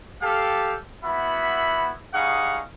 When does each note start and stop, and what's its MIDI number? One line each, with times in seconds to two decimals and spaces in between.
0.21 0.75 67
0.21 0.75 69
0.21 0.75 77
1.03 1.94 59
1.03 1.94 64
1.03 1.94 66
1.03 1.94 76
1.03 1.94 83
2.13 2.60 55
2.13 2.60 63
2.13 2.60 68
2.13 2.60 77
2.13 2.60 78
2.13 2.60 85